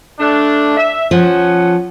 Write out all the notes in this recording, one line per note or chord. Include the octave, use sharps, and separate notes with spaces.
A3 D4
E5
F3 C#4 F#5